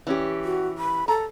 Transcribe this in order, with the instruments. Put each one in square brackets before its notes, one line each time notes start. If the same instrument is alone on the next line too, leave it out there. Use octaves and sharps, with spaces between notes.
[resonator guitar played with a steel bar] E3 C#4 G4
[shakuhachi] F#4
B5
[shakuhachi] A4 [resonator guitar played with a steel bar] A#5